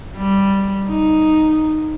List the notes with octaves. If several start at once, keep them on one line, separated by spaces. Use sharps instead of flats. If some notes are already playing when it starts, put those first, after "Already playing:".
G3
D#4